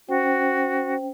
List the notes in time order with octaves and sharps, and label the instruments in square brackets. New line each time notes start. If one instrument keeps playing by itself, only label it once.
[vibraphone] C#4 C5 G5 [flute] F#4